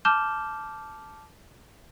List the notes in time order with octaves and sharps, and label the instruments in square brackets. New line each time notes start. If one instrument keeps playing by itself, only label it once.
[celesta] A5 D6 F6 G6 E7 G7